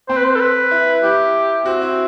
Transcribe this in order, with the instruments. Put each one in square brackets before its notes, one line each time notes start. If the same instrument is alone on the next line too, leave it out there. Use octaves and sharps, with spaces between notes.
[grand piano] C4 [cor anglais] C5
[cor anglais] B4
C5
A4
B4
[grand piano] E4
[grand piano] E4 [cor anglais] G4
[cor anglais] C4 [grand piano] F#4
[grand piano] E4